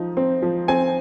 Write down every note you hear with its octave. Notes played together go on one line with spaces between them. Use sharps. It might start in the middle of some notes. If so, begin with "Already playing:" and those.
Already playing: F3 D#4
C4
F3
C4 G#5